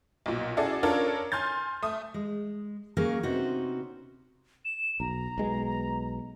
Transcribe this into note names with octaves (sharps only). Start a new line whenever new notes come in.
B1 A#2
C#4 E4 F#4 G#4 A4 D5
C#4 D4 F4 A4 A#4 C#5
G#5 C6 F6 G6 A6
A3 D#6
G#3
F#3 A#3 C#4 G#4 A#4 F5
C3 B3 C#4 D#4 F#4 C5
E7
B1 A#5
B1 G#3 B3